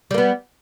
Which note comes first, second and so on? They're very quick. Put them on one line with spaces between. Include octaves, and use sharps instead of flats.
G3 A#3 B3